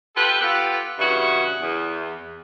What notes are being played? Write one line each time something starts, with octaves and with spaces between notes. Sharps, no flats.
F4 G4 A4 B4
B3 F4 G4 A4 B4
G2 C#3 E3 F#4
E2